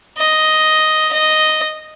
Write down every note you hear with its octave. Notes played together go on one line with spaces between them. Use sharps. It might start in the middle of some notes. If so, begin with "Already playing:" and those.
D#5
D#5